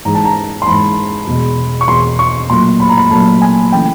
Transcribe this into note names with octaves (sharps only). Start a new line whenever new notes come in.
G#2 E3 G#3 A#5
A5
A#5
C6
G#2 E3 G#3 B5
E2 B2 G#3
C#6
E2 B2 G#3 C6
C#6
A#2 F#3 A3 C6
B5
A#5
B5
A#2 F#3 A3 A5
G#5
C#3 E3 A3 G5